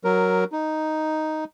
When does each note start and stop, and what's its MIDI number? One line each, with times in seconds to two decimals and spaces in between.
0.04 0.44 54
0.04 0.44 70
0.52 1.44 63